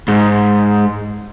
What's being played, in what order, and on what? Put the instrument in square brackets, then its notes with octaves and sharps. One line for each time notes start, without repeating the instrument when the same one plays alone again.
[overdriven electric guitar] G#2